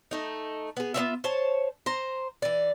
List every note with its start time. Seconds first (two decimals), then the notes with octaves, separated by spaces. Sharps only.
0.11 A3 D#4
0.77 B3 G#4
0.94 B3 C4 F4 E5
1.24 C5 C#5 A5
1.86 C5 A#5
2.42 E3 D5